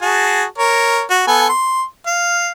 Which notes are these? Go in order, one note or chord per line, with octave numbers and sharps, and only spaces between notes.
F#4 G#4 A5
A#4 C#5
F#4
B3 A4 G#5
C6
F5